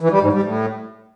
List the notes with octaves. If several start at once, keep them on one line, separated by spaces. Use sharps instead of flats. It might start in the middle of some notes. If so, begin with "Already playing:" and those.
E3
G3
G#2
G3
A2